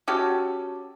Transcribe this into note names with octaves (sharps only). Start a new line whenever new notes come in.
C#4 F#4 G4 A4